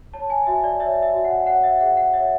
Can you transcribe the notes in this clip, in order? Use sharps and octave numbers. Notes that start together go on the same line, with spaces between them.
C#5 A5
G#5
F#4 E5
D5
C#5 E5
E5
F#4
F#5
C#5 F#5
E5
G#4 F#5
F#5
C#5 E5